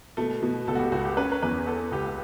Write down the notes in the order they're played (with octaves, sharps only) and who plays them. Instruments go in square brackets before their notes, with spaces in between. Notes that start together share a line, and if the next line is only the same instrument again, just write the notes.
[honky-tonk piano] B2 [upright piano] A3
[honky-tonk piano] B2
[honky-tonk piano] C#2 [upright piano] A4
[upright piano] F#4
G4
[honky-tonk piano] C#2 [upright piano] F#4
[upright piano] G4
[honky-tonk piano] C#4 [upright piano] B4
[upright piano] B4
[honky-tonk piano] E2 [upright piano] B4
[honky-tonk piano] B3 [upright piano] A4
[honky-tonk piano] C#2 [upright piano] G4